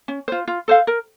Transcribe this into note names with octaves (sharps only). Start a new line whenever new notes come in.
C#4
F4 C5
F4
A4 C5 F5
A#4